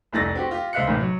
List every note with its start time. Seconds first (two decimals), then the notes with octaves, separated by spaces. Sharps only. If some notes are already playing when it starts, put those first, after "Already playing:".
0.12 F1 C2 E4 A6 A#6
0.35 C4 F#4 G4
0.51 F4 G4
0.73 C#2 C5 E5 F5 F#6 C#7
0.87 A1 G#2 C3
1.00 F#3